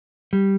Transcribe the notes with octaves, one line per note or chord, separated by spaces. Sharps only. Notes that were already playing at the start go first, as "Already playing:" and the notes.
G3